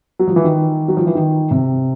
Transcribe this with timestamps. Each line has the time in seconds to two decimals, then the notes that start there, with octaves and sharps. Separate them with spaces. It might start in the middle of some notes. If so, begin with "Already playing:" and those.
0.19 F#3
0.28 F3
0.36 E3
0.44 D#3
0.88 F#3
0.97 F3
1.07 E3
1.15 D#3
1.51 C3